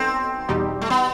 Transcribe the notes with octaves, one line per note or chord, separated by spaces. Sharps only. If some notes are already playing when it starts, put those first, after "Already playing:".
Already playing: F#3 B3 C4 D#4 A4
E2 B2 G3 D#4 G4
A3
B3